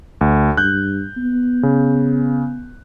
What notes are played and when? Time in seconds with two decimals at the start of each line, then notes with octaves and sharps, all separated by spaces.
0.21 D2
0.57 G2 F#6 G6
1.17 B3
1.63 C#3